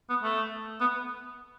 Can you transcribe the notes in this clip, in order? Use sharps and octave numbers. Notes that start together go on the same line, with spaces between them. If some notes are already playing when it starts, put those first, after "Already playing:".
B3
A3
B3